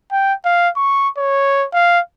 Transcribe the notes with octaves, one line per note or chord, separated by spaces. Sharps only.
G5
F5
C#6
C#5
F5